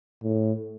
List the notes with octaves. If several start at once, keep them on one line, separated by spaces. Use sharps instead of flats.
A2